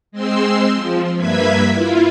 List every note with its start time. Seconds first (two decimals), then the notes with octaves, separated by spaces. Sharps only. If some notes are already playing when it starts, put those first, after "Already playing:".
0.12 G#3 C4 C6 E6
0.73 F3
1.17 G2 A#3 B4 E5 G#6 B6
1.70 E4 F4